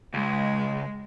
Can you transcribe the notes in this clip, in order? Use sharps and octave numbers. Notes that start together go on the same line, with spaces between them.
C#2 G#3